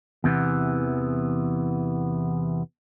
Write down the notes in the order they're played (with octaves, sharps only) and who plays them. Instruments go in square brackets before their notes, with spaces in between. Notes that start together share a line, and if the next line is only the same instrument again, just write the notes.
[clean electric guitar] E2 C3 E3 B3